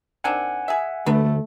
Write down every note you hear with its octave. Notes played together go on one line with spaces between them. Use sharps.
D#3 C4 D4 F#5 G#5
G#4 E5
D2 A3 D4 B4